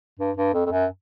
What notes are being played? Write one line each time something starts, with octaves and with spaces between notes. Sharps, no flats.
G2
G2
F2
F2
F#2